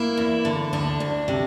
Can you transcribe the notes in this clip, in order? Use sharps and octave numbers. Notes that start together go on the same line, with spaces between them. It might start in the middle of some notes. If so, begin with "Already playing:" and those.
Already playing: A#3 E4
E2
D3
D2 D4
D2
C3